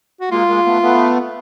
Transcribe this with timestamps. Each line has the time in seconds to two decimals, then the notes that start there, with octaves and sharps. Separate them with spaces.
0.21 F#4
0.31 G#3 A#3 F4
0.48 G#3 A#3
0.66 A3 B3
0.82 A3 B3